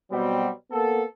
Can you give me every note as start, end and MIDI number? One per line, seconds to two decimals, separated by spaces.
0.11 0.48 47
0.11 0.48 54
0.11 0.48 55
0.11 0.48 60
0.72 1.03 58
0.72 1.03 59
0.72 1.03 69